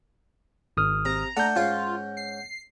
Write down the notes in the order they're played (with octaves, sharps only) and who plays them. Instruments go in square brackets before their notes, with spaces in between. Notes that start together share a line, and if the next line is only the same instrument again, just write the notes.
[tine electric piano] G#1 D#6 F6
[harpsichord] C3 [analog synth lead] A#5
[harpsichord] A3 D4 A4 [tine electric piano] F#5 G6
[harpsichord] G#2 C#4 C#5 [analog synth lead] F4
[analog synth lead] C7